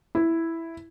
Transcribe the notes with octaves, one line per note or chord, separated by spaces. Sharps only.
E4